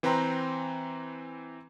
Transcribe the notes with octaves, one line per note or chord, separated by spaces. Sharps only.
E3 C4 B4 G5 A#5 C6